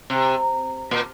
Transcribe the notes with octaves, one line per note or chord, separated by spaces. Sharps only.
C3
A#2